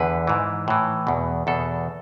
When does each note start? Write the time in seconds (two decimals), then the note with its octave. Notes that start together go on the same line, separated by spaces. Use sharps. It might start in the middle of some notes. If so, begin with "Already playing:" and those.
Already playing: E2 D3 B4
0.27 G#2 E3
0.68 A2 E3
1.07 E2 B2
1.47 E2 B2 A4